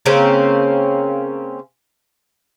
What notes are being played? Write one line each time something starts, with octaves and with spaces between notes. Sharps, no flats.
C#3 A#3 C4 C#4